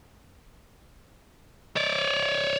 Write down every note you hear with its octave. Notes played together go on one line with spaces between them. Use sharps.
C#5 D5